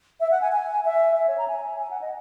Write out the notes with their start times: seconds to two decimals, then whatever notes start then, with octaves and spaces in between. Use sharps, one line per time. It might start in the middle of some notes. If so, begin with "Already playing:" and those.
0.20 E5
0.31 F#5
0.41 G#5
0.52 G#5
0.85 E5
1.16 E5
1.27 C#5
1.38 A#5
1.48 G#5
1.80 G#5
1.90 F#5
2.01 D#5